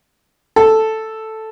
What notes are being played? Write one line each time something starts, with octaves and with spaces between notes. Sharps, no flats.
A4